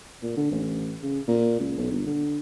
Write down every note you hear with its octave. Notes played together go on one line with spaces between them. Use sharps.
A#2
D3
A1
C#3
A#2
C#2
B1
G1
D3